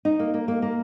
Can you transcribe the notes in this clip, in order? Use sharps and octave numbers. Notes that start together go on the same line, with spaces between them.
D#4
A#3
A#3
A#3
A#3